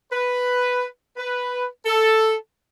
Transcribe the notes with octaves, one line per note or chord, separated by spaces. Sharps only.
B4
B4
A4